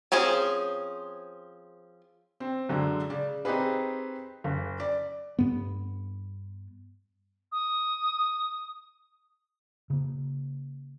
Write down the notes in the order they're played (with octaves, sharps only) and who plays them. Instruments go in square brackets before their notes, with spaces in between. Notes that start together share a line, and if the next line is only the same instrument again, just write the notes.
[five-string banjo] F3 C4 C#4 G#4
[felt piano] C4
F#2 D3 G#3
C#3 D5
C4 D#4 G4 G#4 B4
F#1
D5
[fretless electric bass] G2 B3
[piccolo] D#6
[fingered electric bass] C#3 A#3